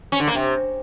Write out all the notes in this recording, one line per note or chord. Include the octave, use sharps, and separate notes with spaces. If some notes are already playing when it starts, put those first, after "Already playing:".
C#4
D3
A#3
C3